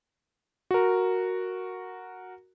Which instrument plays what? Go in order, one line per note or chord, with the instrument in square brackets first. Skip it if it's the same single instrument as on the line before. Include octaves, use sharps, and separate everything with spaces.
[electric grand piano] F#4 A#4